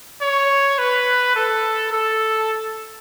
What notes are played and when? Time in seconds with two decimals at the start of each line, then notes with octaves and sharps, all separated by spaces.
0.22 C#5
0.79 B4
1.36 A4
1.93 A4